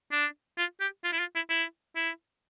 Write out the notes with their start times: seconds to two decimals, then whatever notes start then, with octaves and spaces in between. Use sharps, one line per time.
0.12 D4
0.58 F4
0.80 G4
1.04 F4
1.12 E4
1.20 F4
1.35 E4
1.49 E4
1.96 E4